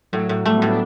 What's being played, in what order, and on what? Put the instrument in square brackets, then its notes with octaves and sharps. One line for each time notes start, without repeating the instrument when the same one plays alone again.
[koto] A2 [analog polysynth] F#3
[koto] A2
[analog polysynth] G3 [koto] A3
[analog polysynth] B3
[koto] A2
[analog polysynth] D4